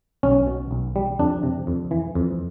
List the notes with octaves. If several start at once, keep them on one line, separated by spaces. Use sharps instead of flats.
B1 C#4
B2
B1
G3
F2 D4
C3
F2
E3
F2